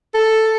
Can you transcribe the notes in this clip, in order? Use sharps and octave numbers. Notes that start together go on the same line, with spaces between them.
A4